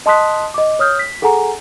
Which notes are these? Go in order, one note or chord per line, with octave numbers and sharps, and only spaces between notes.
D#5 A5 C6 D#6 F#6 B6
D#5 D6
C#5 D#6 F6 G6
B6
G#4 A4 F#5 G#5 A#5